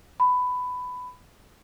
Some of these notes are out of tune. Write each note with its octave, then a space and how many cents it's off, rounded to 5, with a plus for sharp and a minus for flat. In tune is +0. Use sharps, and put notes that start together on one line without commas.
B5 +15